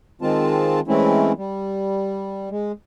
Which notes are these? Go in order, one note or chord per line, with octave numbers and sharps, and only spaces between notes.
D#3 G#3 C4 F4 A5
E3 G#3 A3 C4 C#4 E4
G3
G#3